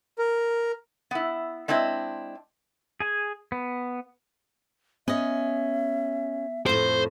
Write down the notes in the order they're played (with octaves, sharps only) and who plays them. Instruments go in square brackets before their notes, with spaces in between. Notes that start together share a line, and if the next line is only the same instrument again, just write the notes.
[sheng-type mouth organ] A#4
[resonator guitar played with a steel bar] B3 E4
G#3 C4 D4 E4 D#5
[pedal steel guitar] G#4 G#5
B3
[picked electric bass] B3 [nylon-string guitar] C#4 D#5 [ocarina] E5
[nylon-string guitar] F2 A2 [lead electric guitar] C5